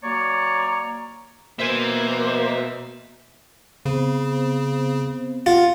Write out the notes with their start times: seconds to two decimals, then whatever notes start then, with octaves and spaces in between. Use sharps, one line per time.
0.04 F#3 A#3 C#5 D5 A#5
1.59 B2 A#3 C5 E5 G#5
3.86 C#3 B3 C4 C5
5.46 F4 F#5